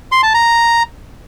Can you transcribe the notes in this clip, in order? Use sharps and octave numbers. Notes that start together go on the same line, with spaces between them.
C6
A5
A#5